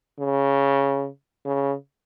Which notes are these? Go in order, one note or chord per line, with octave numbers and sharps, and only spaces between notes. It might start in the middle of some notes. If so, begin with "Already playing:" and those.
C#3
C#3